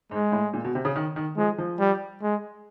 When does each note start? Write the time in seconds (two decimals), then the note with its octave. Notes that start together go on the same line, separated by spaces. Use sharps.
0.11 G#2 G#3
0.32 A2
0.53 A#2
0.65 B2
0.75 C3
0.85 C#3
0.96 D#3
1.16 D#3
1.37 F3 G#3
1.58 F3
1.79 G3
2.22 G#3